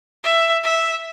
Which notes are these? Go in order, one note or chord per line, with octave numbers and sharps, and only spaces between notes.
E5
E5